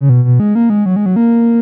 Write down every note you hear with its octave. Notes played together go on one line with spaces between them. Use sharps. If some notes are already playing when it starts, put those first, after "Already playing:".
C#3
B2
B2
G#3
A#3
G#3
F#3
G#3
F#3
A#3